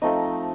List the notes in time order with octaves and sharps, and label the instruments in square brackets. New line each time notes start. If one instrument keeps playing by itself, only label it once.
[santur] F3 A3 C4 D#4 D#5